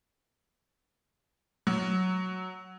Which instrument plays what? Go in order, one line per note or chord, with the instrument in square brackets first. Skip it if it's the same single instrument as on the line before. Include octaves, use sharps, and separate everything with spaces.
[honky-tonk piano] F#3